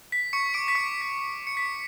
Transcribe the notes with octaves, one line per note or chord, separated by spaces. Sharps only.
B6
C#6 C#7
D6 D7
B6
C#6 C#7
B6
C#7
B6